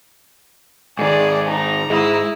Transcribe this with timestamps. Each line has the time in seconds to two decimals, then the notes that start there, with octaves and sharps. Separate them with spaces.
0.99 G#2 D#3 G#4 D5
1.49 D#4 A#5
1.90 G#2 G#3 E4 D#6